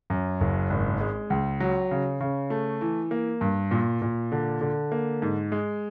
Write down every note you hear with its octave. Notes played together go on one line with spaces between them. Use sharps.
F#2
F#1
G#1
G#3
C#2
F#3
C#3
C#3
A3
E3
A#3
G2
A#2
A#2
D3
D3
A#3
G#2
G#3